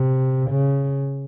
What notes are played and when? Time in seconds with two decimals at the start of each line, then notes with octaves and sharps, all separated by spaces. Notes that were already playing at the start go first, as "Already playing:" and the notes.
Already playing: C3
0.51 C#3